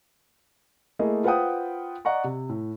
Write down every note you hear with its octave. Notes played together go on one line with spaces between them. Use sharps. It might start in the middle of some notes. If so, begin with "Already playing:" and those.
A3 A#3 E4 G#4 D#5
F4 B4 C5 F#5 G5 D#6
D5 D#5 F#5 A#5 C#6
C3
A2